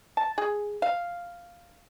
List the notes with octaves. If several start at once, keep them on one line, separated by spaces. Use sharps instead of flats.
A5
G#4
F5